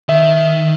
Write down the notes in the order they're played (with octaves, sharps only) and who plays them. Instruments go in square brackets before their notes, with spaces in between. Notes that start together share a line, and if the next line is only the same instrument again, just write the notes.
[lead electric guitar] D#3 [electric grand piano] E5